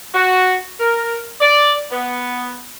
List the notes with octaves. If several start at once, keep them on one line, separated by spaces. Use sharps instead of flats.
F#4
A#4
D5
B3